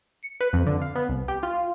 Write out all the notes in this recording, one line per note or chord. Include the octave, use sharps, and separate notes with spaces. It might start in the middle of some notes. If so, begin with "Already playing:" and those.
C#7
B4
F2
D3
F5
B3
C2
G4
F4